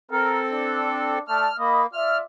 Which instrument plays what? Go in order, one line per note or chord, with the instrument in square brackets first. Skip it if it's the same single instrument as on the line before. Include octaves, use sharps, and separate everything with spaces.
[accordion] C4 A4 [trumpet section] A#4
[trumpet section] D4
[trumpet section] A3 D5 A5 [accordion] F6
[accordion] A#3 [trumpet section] D#5 B5
[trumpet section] F4 D5 E5 [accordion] F6